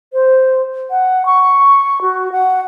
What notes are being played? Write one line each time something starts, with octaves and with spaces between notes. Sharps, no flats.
C5
F#5
C#6
F#4
F#5